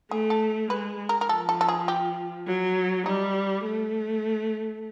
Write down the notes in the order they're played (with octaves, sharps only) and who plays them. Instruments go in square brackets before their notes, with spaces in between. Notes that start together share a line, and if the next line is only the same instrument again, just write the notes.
[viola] A3 [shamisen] G#4
[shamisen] A4
[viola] G#3 [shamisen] B4
[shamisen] A#4
A#4
[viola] F3 [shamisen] A4
[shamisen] A4
A4
G#4
G4
[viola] F#3
[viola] G3 [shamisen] D#4
[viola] A3